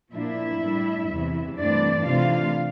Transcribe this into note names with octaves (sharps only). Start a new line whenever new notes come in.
A#2 F3 A#3 D4 E4 E5
A2 G3 D4
E2 C3 E3
G2 E3 A3 C4 D4 D5
C3 E3 A3 D4 F4 F5